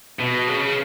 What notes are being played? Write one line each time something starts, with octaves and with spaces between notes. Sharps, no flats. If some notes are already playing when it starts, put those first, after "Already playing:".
B2
C#3